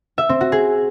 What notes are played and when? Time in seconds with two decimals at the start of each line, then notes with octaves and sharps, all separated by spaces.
0.18 E5
0.29 C4
0.41 F#4
0.52 G#4